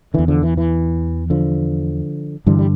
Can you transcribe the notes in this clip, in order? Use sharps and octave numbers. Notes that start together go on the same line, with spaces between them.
E2 D3 E3
D3 F3
E3
E3
D3 F3
G2 D3 E3 G3
G3